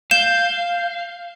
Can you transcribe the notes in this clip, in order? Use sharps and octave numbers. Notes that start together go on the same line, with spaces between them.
F5 G6 E7